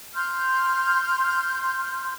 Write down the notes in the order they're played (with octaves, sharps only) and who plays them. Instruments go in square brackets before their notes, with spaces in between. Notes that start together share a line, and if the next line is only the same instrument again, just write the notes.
[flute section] C6 F6 G6